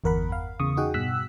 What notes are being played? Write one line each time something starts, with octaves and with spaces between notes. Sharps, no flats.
G1 E2 A#4 F#5 B5
F5
E2 C#3 C#6 D#6
D#4 F#4 G#4 F#5 G5
G2 B2 E6 F#6 B6